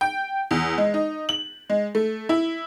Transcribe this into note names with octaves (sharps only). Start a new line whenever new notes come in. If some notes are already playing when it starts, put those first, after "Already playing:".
G5
E2
G#3
D#4
F#7
G#3
A3
E4